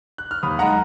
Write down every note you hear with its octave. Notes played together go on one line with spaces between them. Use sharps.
F#6
F6
D#2 B5 D#6
D#3 G#3 F#5 A#5